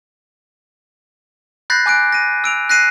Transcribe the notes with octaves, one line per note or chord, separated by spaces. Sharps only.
B5 F#6 G6 A6 A#6 C7
G#5 D6 F#6 D7
A#6 D#7
E6 D7 F7
F#6 A#6 C7 D#7